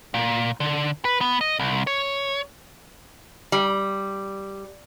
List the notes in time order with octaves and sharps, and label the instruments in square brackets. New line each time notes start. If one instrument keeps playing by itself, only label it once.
[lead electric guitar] A#2
D3
B4
B3
D#5
C2
C#5
[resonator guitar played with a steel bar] G3